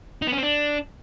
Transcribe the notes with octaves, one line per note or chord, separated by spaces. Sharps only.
D#4
B3
C#4
C4
D4